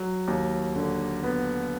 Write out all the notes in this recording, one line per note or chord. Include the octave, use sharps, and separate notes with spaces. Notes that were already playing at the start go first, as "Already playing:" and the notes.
Already playing: F#3
D#2
D3
B3